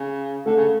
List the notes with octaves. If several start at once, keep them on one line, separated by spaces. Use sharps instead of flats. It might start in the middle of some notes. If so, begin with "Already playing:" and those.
Already playing: C#3
D3 A3 A4
C#3